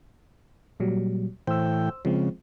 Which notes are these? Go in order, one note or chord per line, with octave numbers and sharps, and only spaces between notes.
A#2 F#3 G3
A2 E3 C5 G5 E6
C#3 F3 G#3 C4